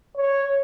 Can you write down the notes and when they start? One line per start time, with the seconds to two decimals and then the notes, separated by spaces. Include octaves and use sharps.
0.17 C#5